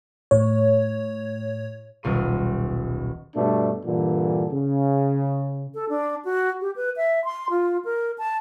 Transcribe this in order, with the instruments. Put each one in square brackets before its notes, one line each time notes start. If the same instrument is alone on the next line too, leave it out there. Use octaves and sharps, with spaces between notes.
[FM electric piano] A2 C#5
[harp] D#1 B1 C6 D#7
[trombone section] G2 B2 A3 D4
G2 A#2 D3 E3
C#3
[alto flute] A4
D4
F#4
G4
B4
E5
C6
F4
A#4
A5